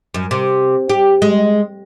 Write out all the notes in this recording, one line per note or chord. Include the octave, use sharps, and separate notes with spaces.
F#2
C3
G4
G#3